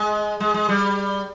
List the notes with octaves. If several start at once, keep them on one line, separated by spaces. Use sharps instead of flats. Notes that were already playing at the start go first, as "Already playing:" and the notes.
Already playing: G#3
G#3
G#3
G3